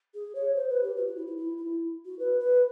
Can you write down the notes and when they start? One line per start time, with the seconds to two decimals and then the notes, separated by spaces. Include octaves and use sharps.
0.14 G#4
0.35 C#5
0.55 C5
0.69 B4
0.82 G4
0.97 F#4
1.06 F4
1.16 E4
1.27 E4
1.37 E4
1.57 E4
2.05 F#4
2.19 B4
2.40 B4